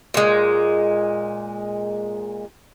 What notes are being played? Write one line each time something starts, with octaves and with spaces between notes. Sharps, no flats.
A#2 G#3